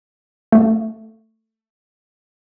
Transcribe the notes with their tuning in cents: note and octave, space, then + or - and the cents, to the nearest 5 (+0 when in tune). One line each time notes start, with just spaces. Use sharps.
A3 +15